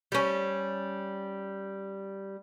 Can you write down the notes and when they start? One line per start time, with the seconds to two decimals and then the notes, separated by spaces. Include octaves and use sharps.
0.12 G3 C#4